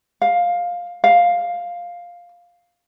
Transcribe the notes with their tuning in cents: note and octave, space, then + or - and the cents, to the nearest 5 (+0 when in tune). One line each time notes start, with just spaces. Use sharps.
F5 +10
F5 +5